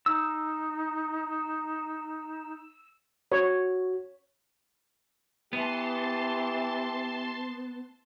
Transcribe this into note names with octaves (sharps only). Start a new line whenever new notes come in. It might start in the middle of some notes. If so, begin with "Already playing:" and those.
D#4 E6
F#4 C#5
E3 B3 G4 A5 C6